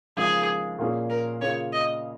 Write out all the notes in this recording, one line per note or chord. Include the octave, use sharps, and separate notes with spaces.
D#2 C#3 F3 G#3 G#4
A#2 A#3 C#4 G#4
A#4
C#3 A#3 F4 G#4 C#5
D#5